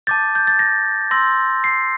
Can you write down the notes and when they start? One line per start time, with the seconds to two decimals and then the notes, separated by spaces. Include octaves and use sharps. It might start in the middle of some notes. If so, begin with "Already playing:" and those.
0.07 A5 D6 G6 A6
0.35 G6
0.47 A6
0.59 A#6
1.11 C6 E6 G6 A#6
1.64 C7